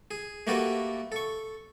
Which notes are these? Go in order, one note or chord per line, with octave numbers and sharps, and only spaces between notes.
G#4
A3 A#3 F#4 G4 A4 B4
A4 C#6